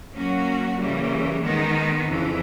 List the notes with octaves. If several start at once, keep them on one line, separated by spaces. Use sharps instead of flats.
F#3 A#3 C#4 F#4
C#3 E3 G3 A#3
D#3 G#3 B3 D#4
F2 C#3 E3